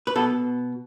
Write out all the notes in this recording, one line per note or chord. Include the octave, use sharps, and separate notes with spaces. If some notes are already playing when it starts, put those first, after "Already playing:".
B4
B2 A4